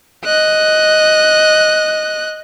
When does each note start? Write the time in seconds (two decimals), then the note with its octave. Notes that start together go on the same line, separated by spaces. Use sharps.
0.25 D#5 F#6